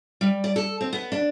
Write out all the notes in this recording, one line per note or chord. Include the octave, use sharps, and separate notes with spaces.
G3
D5
A4
C4
B3
D4